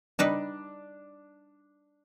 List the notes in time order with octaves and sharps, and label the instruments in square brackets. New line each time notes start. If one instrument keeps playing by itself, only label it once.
[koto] G3 D#4 B4 [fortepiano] D4